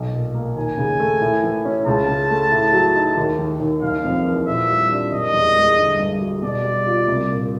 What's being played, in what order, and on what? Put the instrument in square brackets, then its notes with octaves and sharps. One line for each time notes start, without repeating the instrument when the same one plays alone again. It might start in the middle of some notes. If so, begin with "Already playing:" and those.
Already playing: [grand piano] B1
A#2
A#3
[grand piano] D#2 [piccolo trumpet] G#5
[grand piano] C#3
A3
A2
E3
C#4
[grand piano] C#2 [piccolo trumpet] A5
[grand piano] C#3
A3
A2
F#3
D#4
D#2
D#3
D#2
[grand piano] F#1 [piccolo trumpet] F5
[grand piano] F2
E3
[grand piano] A#2 [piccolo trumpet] E5
[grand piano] G3
D4
[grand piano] F#1 [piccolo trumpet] D#5
[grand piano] E2
G#3
G1
G2
F#3
[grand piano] B2 [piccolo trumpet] D5
[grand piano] G3
F4
C2
A#2